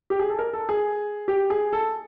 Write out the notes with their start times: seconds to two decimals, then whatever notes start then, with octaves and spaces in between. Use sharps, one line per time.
0.10 G4
0.19 G#4
0.30 A4
0.39 A#4
0.53 A4
0.69 G#4
1.28 G4
1.50 G#4
1.73 A4